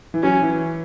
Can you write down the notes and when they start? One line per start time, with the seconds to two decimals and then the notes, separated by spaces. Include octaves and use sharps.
0.14 E3
0.23 F#3 C#4
0.42 E3